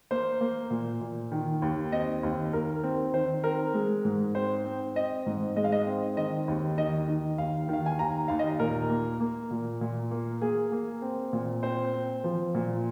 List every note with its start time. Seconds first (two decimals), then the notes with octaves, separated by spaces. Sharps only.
0.11 A#3 C5
0.41 A#3
0.70 A#2
1.01 A#2
1.32 D#3
1.62 D#2
1.92 C4 D#5
2.23 D#2
2.53 D#2 A#4
2.83 C4
3.14 D#3 C5
3.44 C4 A#4
3.74 G#3
4.05 G#2
4.35 C4 C5
4.65 C4
4.95 C4 D#5
5.26 G#2
5.56 G#3 D#5
5.64 F5
5.72 D#5
5.87 C4
6.17 D#3 D#5
6.48 D#2
6.78 D#3 D#5
7.08 D#3
7.38 D#2 F5
7.69 D#3 F5
7.86 G#5
7.99 D#2 A#5
8.28 D#2 F5
8.39 D#5
8.59 A#2 A#4
8.90 A#3
9.20 A#3
9.51 A#2
9.81 A#2
10.11 A#3
10.41 A#3 G#4
10.72 A#3
11.02 C4
11.33 A#2
11.63 C4 C5
11.94 C4
12.24 F3
12.55 A#2